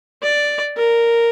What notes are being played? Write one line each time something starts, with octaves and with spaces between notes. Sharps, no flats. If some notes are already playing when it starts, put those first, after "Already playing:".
D5
A#4